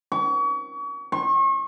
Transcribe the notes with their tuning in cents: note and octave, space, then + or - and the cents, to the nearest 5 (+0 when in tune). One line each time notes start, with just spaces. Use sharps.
C#6 +35
C#6 -40